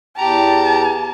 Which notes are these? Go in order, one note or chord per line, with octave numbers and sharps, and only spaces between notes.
E2 G4 A5 A#5